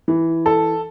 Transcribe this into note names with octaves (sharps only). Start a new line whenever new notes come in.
E3
A4